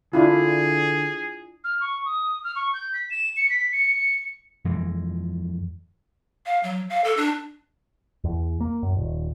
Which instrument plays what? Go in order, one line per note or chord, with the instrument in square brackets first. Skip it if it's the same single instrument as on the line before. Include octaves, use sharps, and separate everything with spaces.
[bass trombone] D3 [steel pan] D4 E4 F4 [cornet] G#4
[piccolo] F6
C#6
D#6
F6
C#6
G6
B6
E7
C#7
B6
C#7
[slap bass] F2 E3 G#3
[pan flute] F5
F#3
F5
A4
D4
[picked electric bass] E2
A#3
F#2
D#1